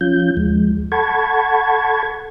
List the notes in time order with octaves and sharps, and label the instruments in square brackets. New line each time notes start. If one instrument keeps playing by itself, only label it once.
[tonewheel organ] F3 C#4 F4 G6
D#2 F3 G#3
A4 F#5 A5 B5 C#6 G#6